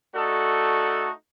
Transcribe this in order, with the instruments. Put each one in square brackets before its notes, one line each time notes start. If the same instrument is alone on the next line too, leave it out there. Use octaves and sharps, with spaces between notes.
[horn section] A3 D4 D#4 F#4 A4